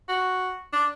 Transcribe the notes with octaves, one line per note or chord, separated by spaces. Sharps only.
F#4
D4